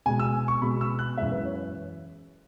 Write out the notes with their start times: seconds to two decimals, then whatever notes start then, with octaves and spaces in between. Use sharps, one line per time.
0.06 B2 G#3 G#5
0.19 E6
0.48 C#6
0.62 B2 G#3 B5
0.81 E6
0.99 F#6
1.17 F#2 E3 G#3 E5
1.32 B4
1.45 C#5